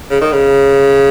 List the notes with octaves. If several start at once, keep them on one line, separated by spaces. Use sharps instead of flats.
C#3
D#3
C#3